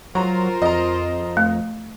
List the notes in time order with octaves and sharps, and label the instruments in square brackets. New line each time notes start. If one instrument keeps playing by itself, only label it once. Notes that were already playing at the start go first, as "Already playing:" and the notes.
[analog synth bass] F#3 [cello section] F4 A#4 C5 [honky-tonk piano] A#5
[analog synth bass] F2 [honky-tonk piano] D#5 A#5
[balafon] A3